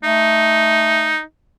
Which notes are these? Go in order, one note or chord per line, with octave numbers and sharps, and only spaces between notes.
A3 D#4